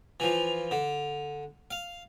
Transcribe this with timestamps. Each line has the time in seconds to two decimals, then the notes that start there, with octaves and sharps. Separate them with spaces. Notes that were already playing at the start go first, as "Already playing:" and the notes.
0.20 E3 F3
0.71 D3
1.71 F5